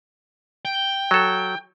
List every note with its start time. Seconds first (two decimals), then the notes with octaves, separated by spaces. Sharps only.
0.65 G5
1.11 F#3 A4